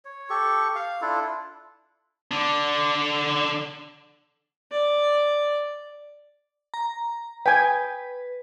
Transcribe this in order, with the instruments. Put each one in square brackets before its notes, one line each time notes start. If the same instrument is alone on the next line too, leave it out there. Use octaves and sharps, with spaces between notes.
[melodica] C#5
G4 A4 C#6
F5
D4 E4 F4 A4
[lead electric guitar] D3 D4
[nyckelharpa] D5
[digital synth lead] A#5
[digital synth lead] B4 [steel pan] G5 G#5